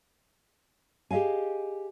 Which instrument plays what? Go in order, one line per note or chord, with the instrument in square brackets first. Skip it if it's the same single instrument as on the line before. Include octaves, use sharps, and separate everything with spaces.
[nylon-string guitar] G4 G#4 D#5 F5 G#5